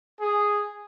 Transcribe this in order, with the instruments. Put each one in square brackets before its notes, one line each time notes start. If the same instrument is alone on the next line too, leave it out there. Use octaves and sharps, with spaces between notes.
[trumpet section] G#4